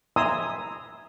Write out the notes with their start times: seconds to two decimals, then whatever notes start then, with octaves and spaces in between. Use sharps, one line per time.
0.16 E5 G#5 A#5 C6 D#6 E6